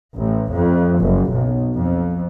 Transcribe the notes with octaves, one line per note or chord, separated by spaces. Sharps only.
A1
F2
F#1
B1
F2